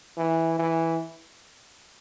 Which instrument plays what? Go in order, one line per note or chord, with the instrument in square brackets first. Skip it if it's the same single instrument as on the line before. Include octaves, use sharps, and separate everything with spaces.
[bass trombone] E3
E3